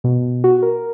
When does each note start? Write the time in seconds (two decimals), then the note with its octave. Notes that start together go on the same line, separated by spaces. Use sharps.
0.04 B2
0.44 F#4
0.62 A#4